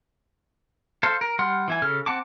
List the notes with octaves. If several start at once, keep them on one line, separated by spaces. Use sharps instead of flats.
A4 C5 F5
A#4
G3 F#5 C6 F6
E3 E4 G#5
C#3 A4 F6
C4 F#5 A5 D6